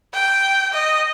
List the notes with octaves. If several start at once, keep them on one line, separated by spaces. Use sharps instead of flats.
G5
D#5